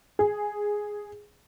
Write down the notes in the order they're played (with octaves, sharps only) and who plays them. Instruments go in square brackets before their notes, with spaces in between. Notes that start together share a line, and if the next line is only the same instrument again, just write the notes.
[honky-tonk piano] G#4